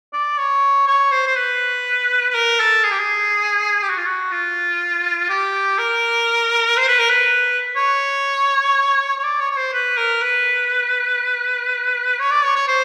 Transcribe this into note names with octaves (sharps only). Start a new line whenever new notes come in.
D5
C#5
C#5
C5
C5
B4
B4
A#4
A4
G#4
G4
G#4
G4
F#4
F4
F#4
F4
G4
A#4
C5
B4
A#4
B4
C#5
C#5
D5
C#5
C#5
C5
B4
A#4
B4
C#5
D5
C#5
C#5
C5